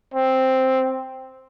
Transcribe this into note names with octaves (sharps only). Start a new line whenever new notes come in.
C4